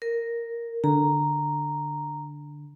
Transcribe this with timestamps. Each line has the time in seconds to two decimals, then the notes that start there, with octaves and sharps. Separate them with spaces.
0.02 A#4
0.84 D3 A#5